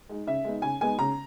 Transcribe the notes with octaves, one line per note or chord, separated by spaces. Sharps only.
G#3 D#4
C#3 E5
G#3 B3 D#4
C#3 G#5
G#3 B3 D#4 G#5
C#3 A#5